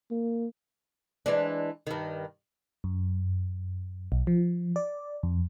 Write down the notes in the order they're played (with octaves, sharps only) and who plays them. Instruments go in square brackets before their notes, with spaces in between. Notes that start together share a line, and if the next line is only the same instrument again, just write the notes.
[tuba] A#3
[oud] E3 G#3 D4
G2 D#3
[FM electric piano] F#2
B1
F3
D5
F2